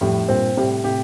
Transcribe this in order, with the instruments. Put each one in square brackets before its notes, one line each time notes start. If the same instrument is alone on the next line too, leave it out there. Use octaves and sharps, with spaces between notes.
[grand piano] F2 A2 [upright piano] G3
[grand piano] G2 A#2 [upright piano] C4
[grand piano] A2 C3 [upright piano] G3
[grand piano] A2 C3 [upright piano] G4